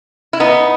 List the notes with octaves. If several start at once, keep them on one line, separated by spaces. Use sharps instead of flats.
E4
B3 D#4